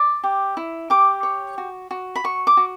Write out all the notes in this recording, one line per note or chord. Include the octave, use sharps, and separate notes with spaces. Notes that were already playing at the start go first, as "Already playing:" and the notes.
Already playing: D5
G4
E4
G4 D6
C#5
F#4
F#4
B5
F#4 C#6
D6
F#4